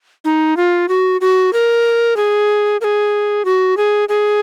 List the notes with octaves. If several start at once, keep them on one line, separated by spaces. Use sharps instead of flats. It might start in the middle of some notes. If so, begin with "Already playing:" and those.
D#4
F4
F#4
F#4
A#4
G#4
A#4
G#4
F#4
G#4
G#4